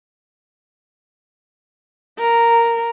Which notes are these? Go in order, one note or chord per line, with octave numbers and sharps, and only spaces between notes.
A#4